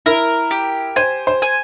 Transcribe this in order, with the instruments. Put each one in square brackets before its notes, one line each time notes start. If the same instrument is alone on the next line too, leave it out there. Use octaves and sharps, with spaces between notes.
[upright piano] E4 [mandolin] A#4
[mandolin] G4
[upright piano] C5 [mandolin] G#5
[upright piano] C5
[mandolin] G#5